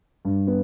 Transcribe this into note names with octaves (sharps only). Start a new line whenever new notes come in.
G2
B3